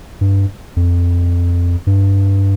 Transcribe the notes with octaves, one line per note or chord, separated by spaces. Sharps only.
G2
F2
G2